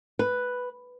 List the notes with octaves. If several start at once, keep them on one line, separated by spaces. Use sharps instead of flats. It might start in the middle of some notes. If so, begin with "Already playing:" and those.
B4